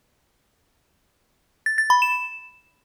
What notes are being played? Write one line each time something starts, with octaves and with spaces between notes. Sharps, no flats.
A6
A6
B5
E7